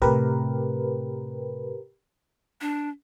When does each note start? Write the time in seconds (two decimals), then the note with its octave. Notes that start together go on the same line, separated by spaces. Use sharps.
0.02 A2 C3 G4 A#4 B4
2.61 D4